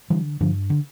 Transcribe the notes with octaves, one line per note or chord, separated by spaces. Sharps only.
D3 E3 G3
G2 D3 F3
D3